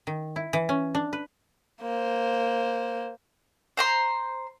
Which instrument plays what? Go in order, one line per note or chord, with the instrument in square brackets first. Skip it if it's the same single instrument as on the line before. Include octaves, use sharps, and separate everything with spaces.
[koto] D#3
E4
E3
C#4
D4
B4
[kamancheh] A#3 C5
[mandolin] C5 A#5 C6